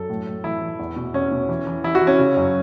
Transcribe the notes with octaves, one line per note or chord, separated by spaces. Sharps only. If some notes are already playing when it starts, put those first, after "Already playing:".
Already playing: F#2 A4
A2
A2
E3 E4
E3
E2
B2
E2 C#4
B2
E3
E3
E3 E4
F#4
E3
C#4
C#3
F#2